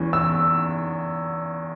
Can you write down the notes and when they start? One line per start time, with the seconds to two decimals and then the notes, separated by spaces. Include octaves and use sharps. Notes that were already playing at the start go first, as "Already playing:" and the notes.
Already playing: E2 E3 C#4
0.13 E6